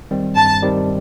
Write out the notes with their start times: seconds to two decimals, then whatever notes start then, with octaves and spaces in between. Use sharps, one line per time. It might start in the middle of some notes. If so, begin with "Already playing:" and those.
0.11 D#3 G3 C4
0.36 G2 A5
0.62 D#3 G3 C4